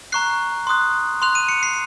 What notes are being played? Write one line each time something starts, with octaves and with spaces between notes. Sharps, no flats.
A#5 C#6 F#6 C7
C6 D#6 F#6
C6 F#6 F7
D#7
C#7
C7